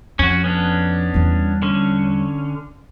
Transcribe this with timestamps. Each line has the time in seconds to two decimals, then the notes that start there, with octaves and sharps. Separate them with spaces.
0.19 F2 C#4 F#4
0.44 B3 C#4 D4
1.14 E2 G3
1.62 D3 C#4